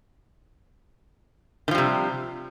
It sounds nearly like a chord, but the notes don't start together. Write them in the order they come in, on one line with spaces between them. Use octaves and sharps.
D#3 F3 G3 C3